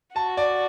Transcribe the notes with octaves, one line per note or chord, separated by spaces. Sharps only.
F#4 A5
D5